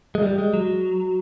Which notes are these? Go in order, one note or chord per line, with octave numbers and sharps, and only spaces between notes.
G#3
G3
G#3
F#3